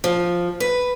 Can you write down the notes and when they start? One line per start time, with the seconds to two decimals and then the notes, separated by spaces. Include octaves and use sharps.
0.04 F3
0.60 B4